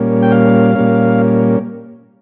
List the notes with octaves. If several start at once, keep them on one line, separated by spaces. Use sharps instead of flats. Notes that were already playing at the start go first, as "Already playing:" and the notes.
Already playing: A#2 G3 A#3 C#4
G5
F5
A#2 G3 A#3 C#4